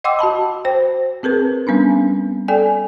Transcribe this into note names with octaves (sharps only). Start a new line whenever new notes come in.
D#5 F#5 G5 C6 D6 E6
F#4 D#5 A5 B5
C5 G5
C4 G#4 A#4 B4
G3 B3 C#4 D4
A4 D5 G5 G#5